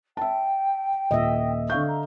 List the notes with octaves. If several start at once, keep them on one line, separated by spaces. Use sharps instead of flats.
E5 G5 A5
D#1 A#2 D#5 E5
D3 F5 C#6 G6
A#5